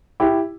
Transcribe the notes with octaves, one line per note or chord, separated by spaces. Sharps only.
E4 G4